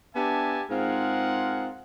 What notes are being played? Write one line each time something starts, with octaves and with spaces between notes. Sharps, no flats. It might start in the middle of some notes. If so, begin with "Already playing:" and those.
B3 D4 G4 E5 G#5 A5
G#2 C4 F4 G#4 A#4 F#5